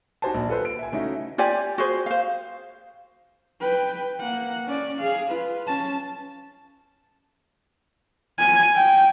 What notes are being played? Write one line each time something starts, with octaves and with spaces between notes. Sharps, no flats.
D#4 F#4 G4 C5 G#5 A5
A#1
F4 A4 B4 C5
D7
E5 G#5
C#3 A3 C#4 D#4 E4 F#4
F4 G4 D5 G#5
F#4 G#4 C5
C5 F5
B4 G5
A#3 F#5
C#4 D5
G#4 F5
F4 B4
C#4 A5
G#5
G5